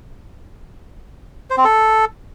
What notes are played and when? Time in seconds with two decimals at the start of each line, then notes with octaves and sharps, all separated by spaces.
1.50 C5
1.57 C4
1.64 A4